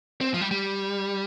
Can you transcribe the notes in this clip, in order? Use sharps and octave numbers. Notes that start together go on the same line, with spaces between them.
C4
F3
G3
G3